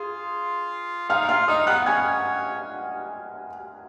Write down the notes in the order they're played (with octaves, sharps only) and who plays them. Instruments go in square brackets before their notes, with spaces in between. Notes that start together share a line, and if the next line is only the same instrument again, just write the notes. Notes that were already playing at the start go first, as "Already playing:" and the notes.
Already playing: [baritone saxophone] F4 [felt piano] G#4
[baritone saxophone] D#4 [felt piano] F5 F6
[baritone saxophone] F4 [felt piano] F5 F6
[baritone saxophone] D#4 [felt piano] D#5 D#6
[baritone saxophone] B3 [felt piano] F#5 F#6
[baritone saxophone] C#4 [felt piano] G#5 G#6